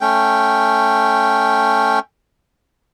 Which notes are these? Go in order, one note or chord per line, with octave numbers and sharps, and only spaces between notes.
A3 C#4 G5